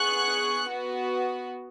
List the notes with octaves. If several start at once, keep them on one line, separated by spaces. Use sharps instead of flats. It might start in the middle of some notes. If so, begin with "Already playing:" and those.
Already playing: B3 G#4 C#6 F#6
B3 F#4